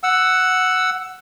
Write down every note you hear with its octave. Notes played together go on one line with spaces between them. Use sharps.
F#5 E6